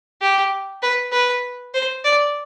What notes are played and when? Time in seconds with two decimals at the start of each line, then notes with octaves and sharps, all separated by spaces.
0.21 G4
0.82 B4
1.12 B4
1.74 C5
2.04 D5